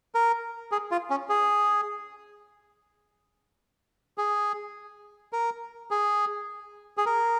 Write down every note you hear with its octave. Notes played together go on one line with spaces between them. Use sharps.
A#4
G#4
F4
C#4
G#4
G#4
A#4
G#4
G#4
A#4